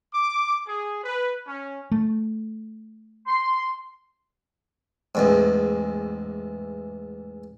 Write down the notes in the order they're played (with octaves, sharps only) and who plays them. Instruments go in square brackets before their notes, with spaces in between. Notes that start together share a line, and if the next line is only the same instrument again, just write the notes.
[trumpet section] D6
G#4
B4
C#4
[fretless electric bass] A3
[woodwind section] C6
[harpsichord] A1 E2 G#2